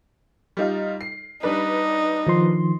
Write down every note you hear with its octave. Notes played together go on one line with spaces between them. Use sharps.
G3 D#4 F4
C7
G3 D4 D#4 B4
D#3 F3 C6